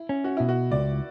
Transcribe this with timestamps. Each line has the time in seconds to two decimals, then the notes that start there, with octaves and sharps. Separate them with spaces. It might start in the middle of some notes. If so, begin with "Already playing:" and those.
Already playing: E4
0.09 C#4
0.24 F#4
0.37 B2 E4
0.49 F#4
0.71 C#2 D5